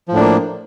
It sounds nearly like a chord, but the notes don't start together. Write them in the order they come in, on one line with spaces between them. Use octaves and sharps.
F3 A2 D4 A#3